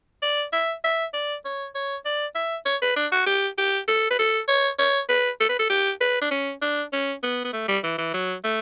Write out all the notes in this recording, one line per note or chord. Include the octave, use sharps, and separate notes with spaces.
D5
E5
E5
D5
C#5
C#5
D5
E5
C#5
B4
D4
F#4
G4
G4
A4
B4
A4
C#5
C#5
B4
A4
B4
A4
G4
B4
D4
C#4
D4
C#4
B3
B3
A3
G3
E3
E3
F#3
A3